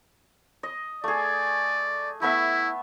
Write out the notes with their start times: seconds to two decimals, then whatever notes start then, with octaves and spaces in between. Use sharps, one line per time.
0.63 D#5
1.04 A3 G#4 D5
2.22 A3 B3 E4 E5